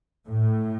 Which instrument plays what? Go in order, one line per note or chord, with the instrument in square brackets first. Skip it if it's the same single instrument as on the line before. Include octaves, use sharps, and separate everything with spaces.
[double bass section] A2